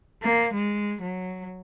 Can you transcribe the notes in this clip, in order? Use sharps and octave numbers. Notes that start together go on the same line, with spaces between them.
A#3
G#3
F#3